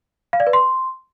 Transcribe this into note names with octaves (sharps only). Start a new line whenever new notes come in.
F5
D5
B4
C6